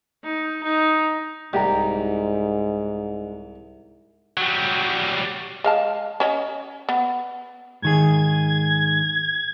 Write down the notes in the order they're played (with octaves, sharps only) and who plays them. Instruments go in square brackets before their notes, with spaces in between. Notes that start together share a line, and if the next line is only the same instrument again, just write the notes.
[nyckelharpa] D#4
D#4
[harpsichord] C2 [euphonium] G#2 [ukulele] G4 D#5 A#5
[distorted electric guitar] F#3 G3
[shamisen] G#3 F5 A5
C#4 C#5 D#5
B3
[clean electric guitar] G#2 D#3 G#4 [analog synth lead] G#6